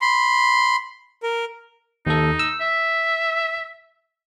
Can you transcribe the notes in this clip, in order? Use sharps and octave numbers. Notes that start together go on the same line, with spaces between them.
B5 C6
A#4
D#2 D#4 A4
E6
E5